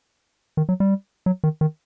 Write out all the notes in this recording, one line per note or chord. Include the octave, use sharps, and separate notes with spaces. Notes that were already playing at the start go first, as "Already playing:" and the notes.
D#3
F#3
G3
F#3
D#3
D#3